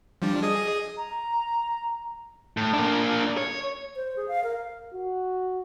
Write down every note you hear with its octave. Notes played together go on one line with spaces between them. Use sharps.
F3 G3 D4
G#4 D#5 D#6
A#5
A2
A#3 D4
C#5
C5
G#4
F5
A#4
F#4